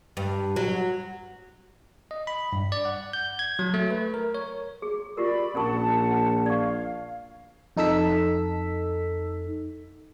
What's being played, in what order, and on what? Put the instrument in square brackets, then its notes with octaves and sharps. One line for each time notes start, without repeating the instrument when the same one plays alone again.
[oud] G2
F#3
[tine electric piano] D#5
B5
G2
D5
F#5
G6
G#6
F#3
A3
B4
A#4
C#5
[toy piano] G#4
[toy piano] F4 G4 A#4 [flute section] D5 B5
[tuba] A#1 [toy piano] C#4 A#4 C#6 [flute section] F#5 A5
[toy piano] D5 C#6 [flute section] F5
[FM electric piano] F2 D#4 A4 E6 B6